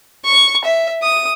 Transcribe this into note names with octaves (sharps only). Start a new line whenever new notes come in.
C#6
E5
D#6